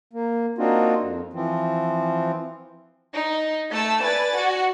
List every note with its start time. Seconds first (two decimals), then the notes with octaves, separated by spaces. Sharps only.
0.13 A#3
0.58 A#3 C4 D4 D#4 F4 F#4
1.00 F2
1.33 E3 F3 C4
3.15 D#4
3.71 A3 A5 E6
4.01 B4 D5 G#5 A6
4.36 F#4